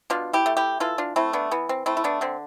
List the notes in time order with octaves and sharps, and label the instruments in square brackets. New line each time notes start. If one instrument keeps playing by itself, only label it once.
[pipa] B2 D4 F4
E4 G4
A3
E4 G4
E3 F4 A4
D4 F4
A3 C4 E4
B3 D4
E3 B3
C4
A3 C4 E4
E4
B3 D4
D3 C4